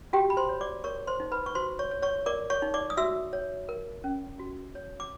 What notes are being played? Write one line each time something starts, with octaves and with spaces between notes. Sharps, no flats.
F#4 G4 G5
B5
C5 C6
C#5
D5 D6
A#4 C#5 C#6
C5 C6
D#4
B4 B5
C#6
F#4 C5 C6
C#5 C#6
C#5
C#5 C#6
A#4 D5 D6
C#5 C#6
D#4
D5 D6
D#6
F#4 E5 E6
C#5
A#4
C#4
F#4
C#5
D6